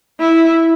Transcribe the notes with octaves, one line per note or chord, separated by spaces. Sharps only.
E4